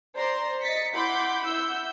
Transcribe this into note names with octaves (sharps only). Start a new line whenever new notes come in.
C5 D5 A#5 C6
D#5 A6 B6 C#7
E4 F#5 B5 C6 D6 G6
E4 F#5 E6 G6